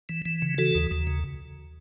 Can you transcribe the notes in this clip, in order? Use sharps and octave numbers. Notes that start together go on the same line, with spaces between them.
E3
E3
C#3
E3 F#4 A4
D#2
D#2
C#3